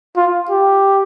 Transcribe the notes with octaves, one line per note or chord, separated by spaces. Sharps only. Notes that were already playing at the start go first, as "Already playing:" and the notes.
F4
G4